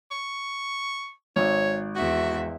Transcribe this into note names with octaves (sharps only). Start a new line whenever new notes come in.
C#6
G#1 C#5 E6
E2 F#4 E5